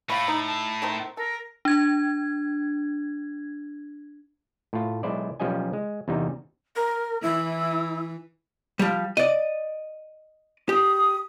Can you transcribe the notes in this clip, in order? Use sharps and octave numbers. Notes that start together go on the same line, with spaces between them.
A2 F5 B5 C#6
D#4
A5
D#3 A3 C4
A4 A#4
D4 G#6
A2 F4
B1 G#3 E4 C5 D5
B1 F3 G3 C#4 D#5 G#5
G#3
E2 C3 G3 D#4
A#4
E3 E4
F3 G3
D5 D#5
G4 D#6